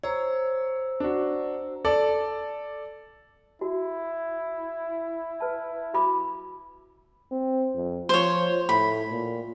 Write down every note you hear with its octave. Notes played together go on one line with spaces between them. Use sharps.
C5 C#5 A#5 E6
D4 F#4
A4 D5
E4 F#4
B4 A5
F#4 B5 D6
C4
F2
F3 C5 C#5
A2 B5
A#2